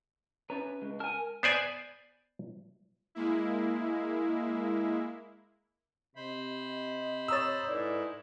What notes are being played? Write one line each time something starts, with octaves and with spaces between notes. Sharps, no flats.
C#4 B4 C#5 A#5
C#3 G#3
A#4 G#5 A5 F6
B3 C5 D5 G#5
G#3 A#3 E4
C3 C5 D#5 B5
C#5 A#5 D#6 E6 A6
G#2 D#4 E4 A4 B4 D5